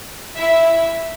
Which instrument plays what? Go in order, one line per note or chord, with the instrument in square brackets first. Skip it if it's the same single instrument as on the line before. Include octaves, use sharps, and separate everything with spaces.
[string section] E4 E5